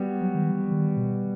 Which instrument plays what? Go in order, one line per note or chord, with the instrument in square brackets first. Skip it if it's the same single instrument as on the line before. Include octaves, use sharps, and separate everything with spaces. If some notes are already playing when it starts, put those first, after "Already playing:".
Already playing: [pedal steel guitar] G3 B3 F#4
[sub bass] F#3
D#3
E3
D#3
B2